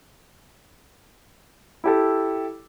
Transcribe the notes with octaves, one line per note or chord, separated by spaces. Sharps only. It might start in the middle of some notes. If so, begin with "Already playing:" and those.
E4 G4 A4